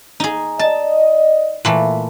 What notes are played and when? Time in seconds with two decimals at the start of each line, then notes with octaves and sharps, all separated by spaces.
0.20 D#4 G#4
0.59 D5 D#5 A5
1.65 A#2 E3 A3